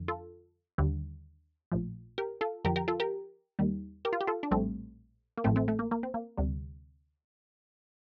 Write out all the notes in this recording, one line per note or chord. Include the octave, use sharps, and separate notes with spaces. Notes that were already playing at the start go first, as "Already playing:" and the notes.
Already playing: F2 D3
F4 A4
D#2 D3 G3
A#1 A2 F3
G4 A#4
F4 A4
F2 D3 F3 G4 A#4
G4 A#4
F4 A4
G4 A#4
D#2 D#3 G3
G4 A#4
F4
G4
F4 A4
D4
A#1 A2 G3 A3 C4
A#3
A1 A2 F3 A3 C4
A3 C4
A3
A#3
A#3
C4
A#3
D2 C3 G3